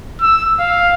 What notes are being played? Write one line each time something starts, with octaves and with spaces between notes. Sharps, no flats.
E6
F5